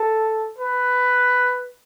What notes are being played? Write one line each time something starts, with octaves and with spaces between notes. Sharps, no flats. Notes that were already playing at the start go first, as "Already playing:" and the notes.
Already playing: A4
B4